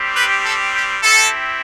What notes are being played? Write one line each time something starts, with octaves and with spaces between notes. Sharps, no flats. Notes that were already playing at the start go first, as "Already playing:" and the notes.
Already playing: G3 C4 G4
B4
A4
G4
C4 E4 G4 A4